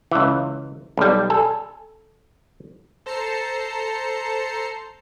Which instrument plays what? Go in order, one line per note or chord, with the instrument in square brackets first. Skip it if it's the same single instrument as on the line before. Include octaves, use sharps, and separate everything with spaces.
[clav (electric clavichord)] C#2 E3
B1 G3
A4 G#5
[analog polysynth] A4 C5 A5 A#5 C7 C#7